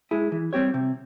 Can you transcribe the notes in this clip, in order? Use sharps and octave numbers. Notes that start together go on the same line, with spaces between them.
G#3 E4 G#4
E3
G3 C4 G4 C#5
C3